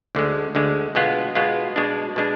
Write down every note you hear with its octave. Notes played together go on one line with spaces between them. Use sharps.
D2 D3 G#3
D2 D3 G#3
B2 G#3 B3 F4
B2 G#3 B3 F4
B2 G#3 D4
B2 G#3 D4